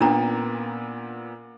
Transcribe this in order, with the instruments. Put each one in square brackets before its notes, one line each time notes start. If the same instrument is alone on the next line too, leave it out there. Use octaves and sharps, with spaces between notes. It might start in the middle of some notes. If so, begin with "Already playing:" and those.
[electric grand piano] A#2 A#3 B3 [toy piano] C#4 D4 A#5